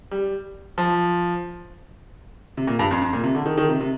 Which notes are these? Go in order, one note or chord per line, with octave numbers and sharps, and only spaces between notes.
G3
F3
C3
A#2
G2
F2
F2
A#2
C3
D3
D#3
D#3
C3
C3